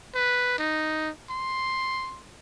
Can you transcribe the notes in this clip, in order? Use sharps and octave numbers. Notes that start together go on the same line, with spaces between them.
B4
D#4
C6